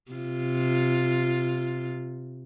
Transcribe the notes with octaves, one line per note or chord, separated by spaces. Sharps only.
C3 F4